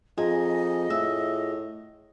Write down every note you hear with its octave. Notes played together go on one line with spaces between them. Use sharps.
F2 F4 G#4 D#5 G#5 A#5
A2 E5